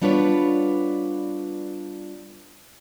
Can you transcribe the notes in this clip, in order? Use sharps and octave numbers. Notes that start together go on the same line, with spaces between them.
G3 B3 D4 F4 B4 C#5